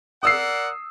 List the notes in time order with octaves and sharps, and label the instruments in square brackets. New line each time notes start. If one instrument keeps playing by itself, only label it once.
[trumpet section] A#4 D5 F#5 [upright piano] D#6 E6 C7